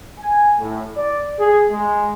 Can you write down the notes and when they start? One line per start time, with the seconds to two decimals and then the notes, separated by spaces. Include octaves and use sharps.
0.18 G#5
0.59 A2
0.95 D5
1.38 G#4
1.70 G#3